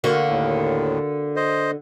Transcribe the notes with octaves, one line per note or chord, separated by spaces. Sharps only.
D3 A#3 F#4
D#2 A2
C5 D#5